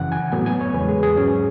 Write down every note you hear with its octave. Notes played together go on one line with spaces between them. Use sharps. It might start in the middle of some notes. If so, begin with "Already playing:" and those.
Already playing: F#2 C#3 E3 F#5
G#5
A2 F#3 B3 G#5
G#5
C#5
E2 C#3 G#3 B4
G#4
G#4
G#2 F#3 C#4